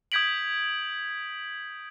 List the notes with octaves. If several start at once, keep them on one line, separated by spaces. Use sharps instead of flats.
D#6 G6 G#6 B6 D7 F#7